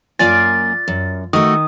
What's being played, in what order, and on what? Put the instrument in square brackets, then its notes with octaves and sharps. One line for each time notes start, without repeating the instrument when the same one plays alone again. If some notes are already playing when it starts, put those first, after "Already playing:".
[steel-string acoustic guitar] F#2 A#3 G#5 [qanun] F4 D5 F5 [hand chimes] A6
[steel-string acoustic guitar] F#2
[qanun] D#3 [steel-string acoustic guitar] A3 F#4 [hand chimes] D#6